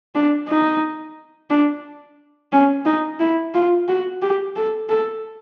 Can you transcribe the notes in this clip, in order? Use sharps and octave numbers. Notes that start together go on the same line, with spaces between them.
D4
D#4
D4
C#4
D#4
E4
F4
F#4
G4
A4
A4